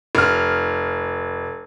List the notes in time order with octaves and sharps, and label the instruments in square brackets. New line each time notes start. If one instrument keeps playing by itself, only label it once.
[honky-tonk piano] F1 F6